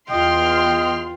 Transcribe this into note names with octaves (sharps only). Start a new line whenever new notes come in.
E2 F4 D#5 G5 C6 F6